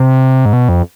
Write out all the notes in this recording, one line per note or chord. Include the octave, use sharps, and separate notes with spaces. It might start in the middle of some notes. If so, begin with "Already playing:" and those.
Already playing: C3
G#2
B2
F2